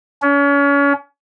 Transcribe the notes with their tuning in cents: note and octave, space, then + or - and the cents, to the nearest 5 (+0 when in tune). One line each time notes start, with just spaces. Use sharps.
C#4 +35